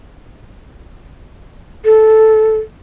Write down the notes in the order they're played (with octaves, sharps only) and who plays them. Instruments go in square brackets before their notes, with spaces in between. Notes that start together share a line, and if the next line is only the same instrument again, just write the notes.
[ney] A4